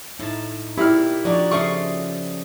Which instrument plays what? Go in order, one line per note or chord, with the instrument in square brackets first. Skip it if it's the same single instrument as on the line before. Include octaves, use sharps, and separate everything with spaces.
[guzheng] A2 A5 [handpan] D#4
[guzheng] A#2 B5 [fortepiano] E4 F6 [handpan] G4
[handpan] F3 D5 [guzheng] D4 D#4 F#4
[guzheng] C#3 A3 C5 [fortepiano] C#6